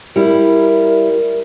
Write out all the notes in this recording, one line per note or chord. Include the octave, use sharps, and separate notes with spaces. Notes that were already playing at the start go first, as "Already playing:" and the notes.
G3 E4 A#4